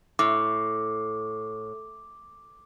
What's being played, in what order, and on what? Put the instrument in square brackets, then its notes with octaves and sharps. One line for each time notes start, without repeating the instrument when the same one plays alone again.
[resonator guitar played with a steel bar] A2 [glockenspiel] D6